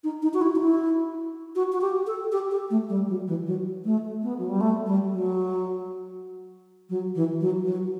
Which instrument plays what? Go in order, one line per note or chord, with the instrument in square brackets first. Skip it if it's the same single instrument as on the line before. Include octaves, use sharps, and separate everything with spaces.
[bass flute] D#4
D#4
F#4
E4
D#4
E4
F#4
F#4
G4
A4
G4
G4
A3
G3
F#3
E3
F#3
A3
B3
F#3
G3
A3
G3
F#3
F#3
E3
F#3
F#3